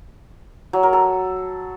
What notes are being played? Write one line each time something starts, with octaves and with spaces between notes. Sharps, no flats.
F#3
A#4
A4